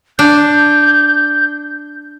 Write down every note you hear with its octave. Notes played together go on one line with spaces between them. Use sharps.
D4 G6